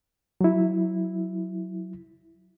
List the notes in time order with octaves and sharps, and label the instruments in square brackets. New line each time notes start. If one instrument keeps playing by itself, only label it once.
[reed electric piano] F#3 E4